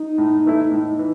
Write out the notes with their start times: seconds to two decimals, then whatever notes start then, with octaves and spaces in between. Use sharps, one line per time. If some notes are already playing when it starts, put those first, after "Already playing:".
Already playing: D#4
0.18 A2
0.46 E3 A3 E4
0.72 A2 D#4
0.99 E3